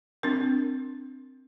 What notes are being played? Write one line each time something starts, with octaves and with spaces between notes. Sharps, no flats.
C4 D4 A#4